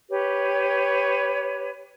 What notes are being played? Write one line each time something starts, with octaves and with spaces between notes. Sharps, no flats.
G4 B4 C#5